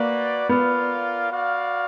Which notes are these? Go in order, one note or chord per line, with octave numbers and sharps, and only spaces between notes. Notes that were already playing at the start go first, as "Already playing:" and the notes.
Already playing: A#3 F#4 B4 D5
B3 F4 A#4 D5 F5
F#4 D5 F5